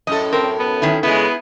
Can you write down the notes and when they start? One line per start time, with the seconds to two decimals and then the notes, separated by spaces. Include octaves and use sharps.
0.07 F#2 A2 A4 D#5
0.33 C4 A#4
0.60 B3
0.82 D#3 C#4 E4
1.03 C#3 G#3 B3 E4 G#4